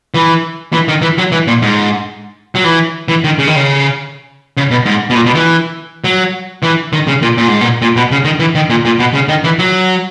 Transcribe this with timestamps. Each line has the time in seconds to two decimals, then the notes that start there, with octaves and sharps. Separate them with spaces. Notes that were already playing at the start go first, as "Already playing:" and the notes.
0.14 E3
0.73 E3
0.88 D#3
1.02 E3
1.18 F#3
1.32 E3
1.47 A#2
1.62 G#2
2.55 F#3
2.64 E3
3.08 E3
3.24 D#3
3.39 C#3
3.47 D#3
3.56 C#3
4.57 C#3
4.71 B2
4.85 G#2
5.10 B2
5.15 A#2
5.26 B2
5.35 E3
6.04 F#3
6.63 E3
6.93 D#3
7.07 C#3
7.22 A#2
7.37 A#2
7.48 G#2
7.61 A#2
7.82 A#2
7.96 B2
8.11 C#3
8.25 D#3
8.40 E3
8.55 D#3
8.70 A#2
8.85 A#2
8.99 B2
9.14 C#3
9.28 D#3
9.44 E3
9.59 F#3